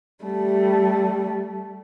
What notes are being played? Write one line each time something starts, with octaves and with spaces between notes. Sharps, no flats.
G3 A3